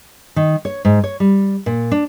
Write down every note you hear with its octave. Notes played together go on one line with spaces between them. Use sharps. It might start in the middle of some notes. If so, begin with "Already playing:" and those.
D#3
C#5
G#2
C#5
G3
A#2
D4